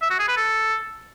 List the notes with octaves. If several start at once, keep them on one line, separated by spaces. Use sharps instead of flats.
E5
F#4
G#4
B4
A4